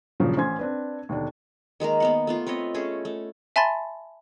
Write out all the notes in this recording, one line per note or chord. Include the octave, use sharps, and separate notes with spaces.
G2 A#2 C#3 F3 F#3
A1 C#4 C5 G#5 C6 G#6
C4 D4 B4
D#2 B2 D3 D4
D#3 G#3 A#3 A#4
A#3 B3 F#5
A3 B3 F4
C4 B4 C#5 D#5
A3 C#4 G#4
A3
E5 G#5 A5 B5 C6 A6